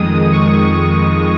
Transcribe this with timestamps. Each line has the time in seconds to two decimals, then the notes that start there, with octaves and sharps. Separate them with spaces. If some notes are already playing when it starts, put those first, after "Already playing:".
Already playing: F2 D#3 G#3 D#6
0.32 C#6